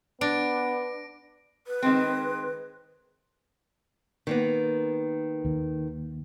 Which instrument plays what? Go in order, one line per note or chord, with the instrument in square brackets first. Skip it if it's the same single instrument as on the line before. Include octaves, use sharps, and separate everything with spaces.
[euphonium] B3 [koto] D4 [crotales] A#6 D7
[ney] B4
[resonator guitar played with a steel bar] D#3 G#3 C4
[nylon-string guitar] D#3 A#3 B3
[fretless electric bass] D#2